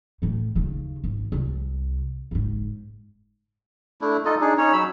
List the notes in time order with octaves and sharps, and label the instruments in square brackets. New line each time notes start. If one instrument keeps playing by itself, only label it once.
[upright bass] A2 E3
D#2 C#3
G#1
C2
F#1 G#2
[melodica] A3 D4 E4
D#4 F4 A4 D#5
D4 D#4 G#4
C#4 D#4 C#5
F#3 B5 E6